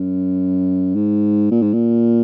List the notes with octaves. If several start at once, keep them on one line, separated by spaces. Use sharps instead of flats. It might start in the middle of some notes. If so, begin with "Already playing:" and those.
Already playing: F#2
G#2
A#2
G#2
A#2